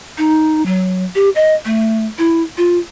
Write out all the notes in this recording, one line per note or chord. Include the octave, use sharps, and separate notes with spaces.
D#4
F#3
G4
D#5
A3
E4
F4